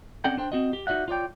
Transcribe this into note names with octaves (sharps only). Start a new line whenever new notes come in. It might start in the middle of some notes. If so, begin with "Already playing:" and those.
C4 C#4 A4 D5 F#5 G5
D4 C5 G5
C4 F#4 D#5
G4
D#4 F#4 D5 E5 F#5
F4 C#5 D5 G5